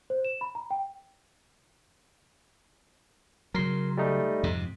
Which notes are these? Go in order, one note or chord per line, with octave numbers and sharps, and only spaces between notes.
C5
E7
B5
A#5
G5
C#3 F#3 A#4 C6
G3 A3 D#4
F2 G#2 C3